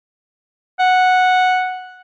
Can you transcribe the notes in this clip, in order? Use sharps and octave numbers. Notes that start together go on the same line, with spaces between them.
F#5